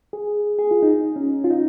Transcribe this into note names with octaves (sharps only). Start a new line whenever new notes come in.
G#4
G#4
F4
D#4
C#4
F4
D#4